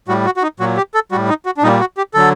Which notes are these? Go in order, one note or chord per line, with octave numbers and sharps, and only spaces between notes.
A2 G3 F#4
F#4
F#4
D#4
A#2 F#3 F#4
G4
A4
A2 G3 F#4
D#4
F#4
D4
A#2 G3 D#4
F#4
G4
D3 F#3 A4